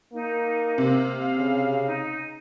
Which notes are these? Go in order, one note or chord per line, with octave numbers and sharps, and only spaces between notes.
A#3 D#4
C3 F5
C#3
D#4